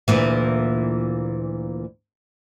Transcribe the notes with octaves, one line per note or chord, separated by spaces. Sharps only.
D2 A#2 E3